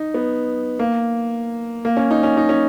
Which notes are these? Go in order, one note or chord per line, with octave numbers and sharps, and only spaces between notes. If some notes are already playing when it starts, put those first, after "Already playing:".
Already playing: D#4
B3
A#3
A#3
C#4
D#4
C#4
D#4
C#4